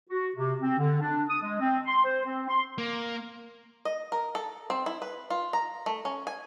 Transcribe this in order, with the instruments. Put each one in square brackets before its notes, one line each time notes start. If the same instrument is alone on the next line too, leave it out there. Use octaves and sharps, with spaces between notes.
[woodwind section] F#4
C3
C4
D3
D4
D#6
G#3
C4
C6
C5
C4
C6
[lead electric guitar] A#3
[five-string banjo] D#5
A#4
A4
C4
E4
B4
F4
A#5
A3
C#4
G#5